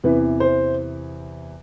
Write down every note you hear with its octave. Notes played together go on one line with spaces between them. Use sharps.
E2 C3 E3 B4
C5